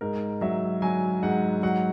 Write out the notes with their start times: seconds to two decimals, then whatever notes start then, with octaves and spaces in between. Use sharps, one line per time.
0.01 G#2 A#4
0.41 F#3 E5
0.82 F#3 G#5
1.23 G#2 F#5
1.63 F#3 F#5